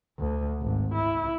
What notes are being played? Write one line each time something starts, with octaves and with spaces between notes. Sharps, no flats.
D2
G#1
E4